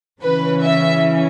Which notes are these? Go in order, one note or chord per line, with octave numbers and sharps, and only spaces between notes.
C#3 E3 C#4 B4
E5